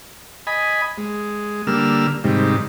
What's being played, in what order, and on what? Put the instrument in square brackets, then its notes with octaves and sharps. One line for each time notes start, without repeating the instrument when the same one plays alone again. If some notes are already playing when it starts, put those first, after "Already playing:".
[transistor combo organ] D#5 G#5 B5
G#3
D3 G3 A#3 E6 F6
G#2 C3 D#3 G3